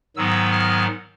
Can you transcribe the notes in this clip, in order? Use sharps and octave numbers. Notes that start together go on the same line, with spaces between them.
G#2 D#3 F#3 B3 E6
F6